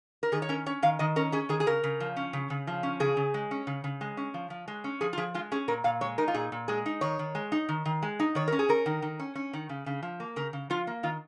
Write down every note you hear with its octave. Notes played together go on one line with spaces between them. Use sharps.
A#4
D#3 G#4
C#5
C#4 A#4
C#4 C#5
D#3 F5
D#3 D#5
C#4 A#4
C#4 G#4
D#3 G#4
G#4
C#3 A#4
C#3
F3
C#4
C#3
C#3
F3
C#4
C#3 G#4
C#3
G#3
C#4
C#3
C#3
G#3
C#4
F3
F3
G#3
C#4
F3 G#4
F4
F3 G#4
G#3 F4
C#4 G#4
A#2 A#4
A#2 F5
G#3 C#5
D#4 A#4
F4
A#2 G#4
A#2
G#3 G#4
D#4
D#3 C#5
D#3
G#3
D#4
D#3
D#3
G#3
D#4
D#3 C#5
C#4 A#4
G#4
C#4 A#4
D#3
D#3
C#4
C#4
D#3
C#3
C#3
F3
A#3
C#3 A#4
C#3
F3 F4
A#3
D#3 F4